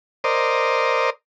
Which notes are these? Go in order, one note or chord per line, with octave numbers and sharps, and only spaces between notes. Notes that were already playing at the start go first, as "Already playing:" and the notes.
A#4 C5 D5 D#5